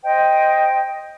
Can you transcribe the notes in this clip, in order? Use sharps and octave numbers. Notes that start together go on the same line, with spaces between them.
C5 D#5 G5